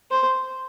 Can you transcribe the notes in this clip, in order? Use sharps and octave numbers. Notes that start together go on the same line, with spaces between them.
C5